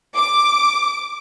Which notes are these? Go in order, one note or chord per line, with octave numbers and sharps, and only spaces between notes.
D6